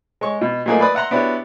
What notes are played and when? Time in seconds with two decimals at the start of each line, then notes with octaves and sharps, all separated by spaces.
0.21 G#3 C#5 C#6
0.41 B2
0.66 A#2 F#3 A3 A#3 D#4 G#4
0.81 B4 D5 B5 D6 D#6
0.95 E5 F#5 A#5 C6
1.11 B3 D4 E4 F#4 G4 C#5